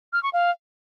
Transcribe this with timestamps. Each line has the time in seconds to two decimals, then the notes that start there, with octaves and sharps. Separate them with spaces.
0.13 F6
0.23 C#6
0.33 F5